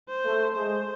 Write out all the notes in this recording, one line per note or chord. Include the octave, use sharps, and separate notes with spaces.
C5
A3
G#3 C5